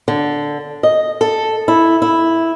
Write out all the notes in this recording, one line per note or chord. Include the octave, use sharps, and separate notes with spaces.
D3
D#5
A4
E4
E4